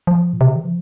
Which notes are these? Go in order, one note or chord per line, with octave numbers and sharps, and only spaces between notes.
F3
A#2
C3
C#3
E3
F3